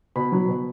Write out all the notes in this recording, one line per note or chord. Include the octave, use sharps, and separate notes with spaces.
B2 B5
F#3
B2